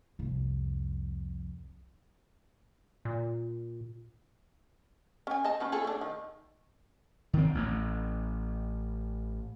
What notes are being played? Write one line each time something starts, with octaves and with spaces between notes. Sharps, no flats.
C2 F2
A#2
C#4 G#5
D#5 G#5 A5
D#3 C#4 B4
F4 G#4 A4
A3 D4
D#3
D#3 C4
A1